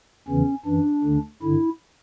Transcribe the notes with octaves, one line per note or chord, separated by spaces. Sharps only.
E2 C#3 E3 C#4
F#2 E3 D4
D2 D3
G2 D3 E4